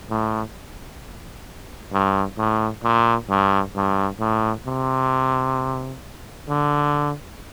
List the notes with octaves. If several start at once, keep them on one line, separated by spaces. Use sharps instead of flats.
A2
G2
A2
A#2
G2
G2
A2
C3
D3